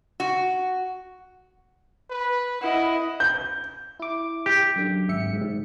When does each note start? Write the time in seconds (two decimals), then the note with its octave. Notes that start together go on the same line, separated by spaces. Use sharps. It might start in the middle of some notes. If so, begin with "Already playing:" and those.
0.20 F#4
2.10 B4
2.62 E4 D#5 F#5
3.20 G6
4.00 E4 D6
4.46 G4
4.76 F#2 D3
5.09 G#1 E5 C#7
5.33 G#2